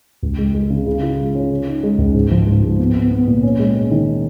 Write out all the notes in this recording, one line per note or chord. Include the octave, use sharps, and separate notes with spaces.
C#2
G#3
G#3
C#3
C#3
F4
G#3
C#4
C#3
D#4
G#3
C#2
G#2
F3
G#2
G#2
B3
B3
B3
A#2
C#4
G#3
C#4
D#3